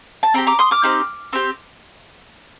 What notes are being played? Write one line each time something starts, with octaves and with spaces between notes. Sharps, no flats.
A5
C4 G4 G5 A#5
A#5 D6
C6 D#6
D6 F6
C4 D#4 G4
C4 G4